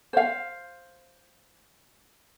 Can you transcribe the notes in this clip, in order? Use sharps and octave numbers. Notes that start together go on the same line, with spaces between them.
C5 F5